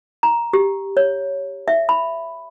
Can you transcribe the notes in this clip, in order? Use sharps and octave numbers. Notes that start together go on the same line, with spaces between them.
A#5
G4
C#5
E5
B5